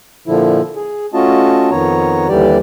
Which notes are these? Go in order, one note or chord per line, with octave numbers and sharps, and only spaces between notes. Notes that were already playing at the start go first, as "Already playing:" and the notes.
A#2 D3 F3 E4
G#4
A3 C#4 F4 F#4 D#5 A5
F2 D#3 B3 C#5 A#5
D#2 D3 E3 G3 G4 D5